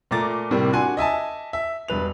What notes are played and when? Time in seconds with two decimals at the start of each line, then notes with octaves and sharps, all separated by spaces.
0.11 A#2 A3 A#5 D6 A6
0.51 A2 C3 G3 A#3
0.73 D4 F#4 G#5 C6
0.97 D#5 E5 G#5 A5
1.53 E5
1.88 E1 G2 B4 F7